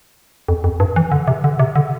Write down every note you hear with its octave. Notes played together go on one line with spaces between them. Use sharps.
F2
F2
G2
E3
D3
C3
D3
C3
D3